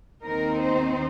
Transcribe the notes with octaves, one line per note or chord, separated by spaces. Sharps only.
D#2 D#3 C4 D#4 A#4
C5